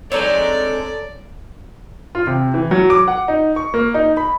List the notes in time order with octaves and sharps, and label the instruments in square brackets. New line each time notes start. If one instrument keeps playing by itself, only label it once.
[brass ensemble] G#3 A4 [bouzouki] C4 D4 D#4 [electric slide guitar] C#5 A#5 [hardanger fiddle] D5
[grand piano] F4
C3
E3
F#3
D6
F#5
D#4
C#6
A#3
D#4
B5